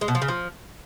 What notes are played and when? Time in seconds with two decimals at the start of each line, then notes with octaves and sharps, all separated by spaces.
0.01 G#3
0.08 B2
0.15 F3
0.22 C#3
0.28 F3